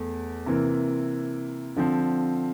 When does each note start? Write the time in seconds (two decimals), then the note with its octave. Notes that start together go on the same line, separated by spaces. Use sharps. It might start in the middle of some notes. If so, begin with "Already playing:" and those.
Already playing: E2 A3
0.46 C3 E3 A#3
1.76 D3 F3 C4